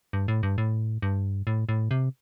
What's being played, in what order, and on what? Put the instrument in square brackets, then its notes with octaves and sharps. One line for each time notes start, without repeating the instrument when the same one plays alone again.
[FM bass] G2
A2
G2
A2
G2
A2
A2
C3